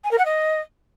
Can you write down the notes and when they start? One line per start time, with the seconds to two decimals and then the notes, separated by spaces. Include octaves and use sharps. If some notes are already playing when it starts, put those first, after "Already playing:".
0.04 G#5
0.11 A#4
0.18 F#5
0.25 D#5